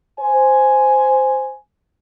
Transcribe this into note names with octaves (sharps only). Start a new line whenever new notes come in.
C5 G#5